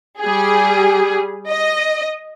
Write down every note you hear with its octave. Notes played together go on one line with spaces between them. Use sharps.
G3 G#4
D#5